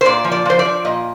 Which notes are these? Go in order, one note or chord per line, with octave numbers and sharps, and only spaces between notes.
C5
A#2 D5
F3
D5
F3 C5
D5
F3
A#2 D#5